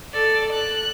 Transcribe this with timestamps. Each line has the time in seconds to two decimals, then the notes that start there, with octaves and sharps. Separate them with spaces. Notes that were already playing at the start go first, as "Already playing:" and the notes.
0.13 A4 D5
0.53 F#6